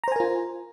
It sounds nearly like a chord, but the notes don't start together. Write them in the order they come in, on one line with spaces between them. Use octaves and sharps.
A#5 C5 G#5 A#4 F4